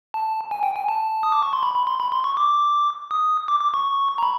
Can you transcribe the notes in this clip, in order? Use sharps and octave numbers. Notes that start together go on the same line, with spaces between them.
A5
G#5
G5
G#5
A5
D#6
D6
C#6
C6
B5
B5
C6
B5
C6
C#6
D6
D#6
D6
D6
C#6
A#5
B5